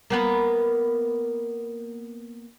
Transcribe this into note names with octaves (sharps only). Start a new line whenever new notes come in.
A#3 B3 B4